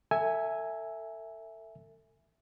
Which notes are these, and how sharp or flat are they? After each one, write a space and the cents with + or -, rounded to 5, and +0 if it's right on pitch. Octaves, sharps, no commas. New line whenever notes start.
A4 +30 E5 +0 G#5 +0